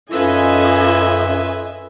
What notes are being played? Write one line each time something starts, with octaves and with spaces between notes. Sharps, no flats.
F#2 C#4 F4 A4 B4 D#5 E5 G#5